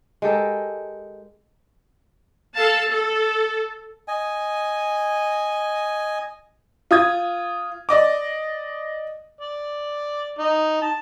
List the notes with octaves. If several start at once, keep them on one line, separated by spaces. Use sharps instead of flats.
G#3 G4 A4 A#4
A4 F5 A5
A4
D#5 G#5
F4 D#6 G#6
D5 D#5 D6
D5
D#4
A5